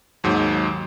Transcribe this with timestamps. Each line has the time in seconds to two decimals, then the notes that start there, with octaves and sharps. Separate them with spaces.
0.24 D#2 G#2 F#3